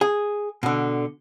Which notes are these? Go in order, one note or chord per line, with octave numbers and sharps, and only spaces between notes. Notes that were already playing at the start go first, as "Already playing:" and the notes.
G#4
B2 D3